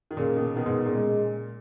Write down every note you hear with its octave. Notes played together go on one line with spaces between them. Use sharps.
D#3
A#2 C#3 A#3
B2 D#3
B2 D#3 B3
G#2 B2
A#2 C#3
G#3